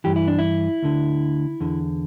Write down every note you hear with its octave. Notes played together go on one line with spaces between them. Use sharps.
G2 E3 G4
E4
D4
E4
D2 D3
E2 D3